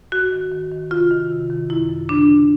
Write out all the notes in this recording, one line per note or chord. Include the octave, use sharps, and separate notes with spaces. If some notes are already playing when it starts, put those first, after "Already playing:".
G#2 F#4
D#3
D#3
D#3
C3 F4
D#3
C3
D#3
F#2 E4
F#2
C#3 D4
C#3